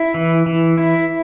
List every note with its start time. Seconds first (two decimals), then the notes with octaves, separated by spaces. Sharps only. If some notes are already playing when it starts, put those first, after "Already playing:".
Already playing: E4
0.14 E3
0.46 E3
0.78 E4